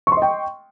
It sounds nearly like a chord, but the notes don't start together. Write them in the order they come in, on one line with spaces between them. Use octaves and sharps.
C#6 C6 D#5 G5